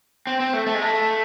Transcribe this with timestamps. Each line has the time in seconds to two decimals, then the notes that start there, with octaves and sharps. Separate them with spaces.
0.27 C4
0.40 C4
0.53 A3
0.67 A3
0.74 G#3
0.82 A3